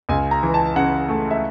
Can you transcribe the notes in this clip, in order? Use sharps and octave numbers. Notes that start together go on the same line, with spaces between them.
C#2 G#5
A#5
E3
A5
C#3 F#5
A3
E5